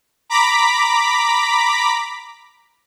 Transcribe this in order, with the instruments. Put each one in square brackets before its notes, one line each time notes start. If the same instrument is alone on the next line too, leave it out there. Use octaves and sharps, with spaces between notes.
[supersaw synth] A#5 B5 D6 B6